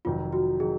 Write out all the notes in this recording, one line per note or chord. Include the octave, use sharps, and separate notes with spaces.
F1 F2 D#3 F#3 F4
F#4
D#3 F#3 G#4